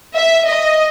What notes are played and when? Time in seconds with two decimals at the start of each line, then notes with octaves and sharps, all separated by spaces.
0.16 E5
0.47 D#5